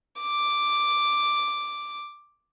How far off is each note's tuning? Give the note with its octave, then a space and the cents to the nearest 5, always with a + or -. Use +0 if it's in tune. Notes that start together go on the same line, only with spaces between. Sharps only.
D6 +0